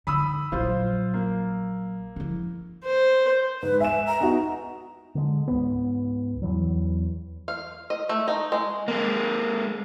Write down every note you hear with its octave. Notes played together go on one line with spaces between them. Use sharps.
D3 D#4 B5 D#6 E6
A#1 F#3 F4 C5
A#3
F3 E4
C5
G#2 B4
E5 G#5 E7
A#5
B3 D#4 F#4
D3 G#3
C#2 G#2 B3
E2 E3 F#3
F5
D#5
A3
D#4
G#3
G#3 A#3